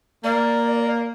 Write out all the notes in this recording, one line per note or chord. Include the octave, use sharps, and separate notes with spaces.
A#3 D5